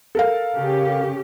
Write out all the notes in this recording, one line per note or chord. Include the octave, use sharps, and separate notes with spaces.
A4 A#4 F5
C#3 C#4 G4